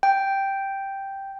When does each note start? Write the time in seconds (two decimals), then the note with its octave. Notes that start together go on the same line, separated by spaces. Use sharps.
0.03 G5